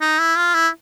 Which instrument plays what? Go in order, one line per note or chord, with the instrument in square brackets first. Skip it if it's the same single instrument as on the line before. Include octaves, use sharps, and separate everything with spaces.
[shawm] D#4
E4
F4
E4